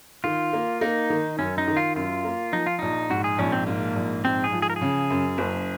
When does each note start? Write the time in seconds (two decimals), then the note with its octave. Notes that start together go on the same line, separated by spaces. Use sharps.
0.24 D#3 F4
0.53 A#3
0.81 A#3 D#4
1.10 D#3
1.39 F#2 C#4
1.58 D#4
1.68 D#3
1.77 F4
1.96 F#2 F4
2.25 A#3
2.52 F3 D#4
2.67 F4
2.79 A#1 D#4
3.10 G#2 F#4
3.24 G#4
3.38 A#1 C#4
3.52 C4
3.67 G#2 A#3
3.95 A#1
4.25 G#2 C4
4.44 G#4
4.52 F3
4.62 G#4
4.70 A#4
4.76 G#4
4.81 C#3
5.10 F#2
5.38 F#1